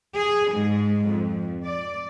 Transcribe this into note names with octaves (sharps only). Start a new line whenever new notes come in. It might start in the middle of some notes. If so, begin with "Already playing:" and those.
G#4
G#2
F2
D5